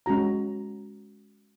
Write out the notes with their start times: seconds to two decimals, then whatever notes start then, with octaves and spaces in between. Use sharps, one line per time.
0.06 G#3 C#4 F#4 A#5